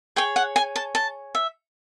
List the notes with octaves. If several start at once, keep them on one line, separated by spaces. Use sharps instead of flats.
G#4 C#5 G5
F#5
G#5
A5
A5
E5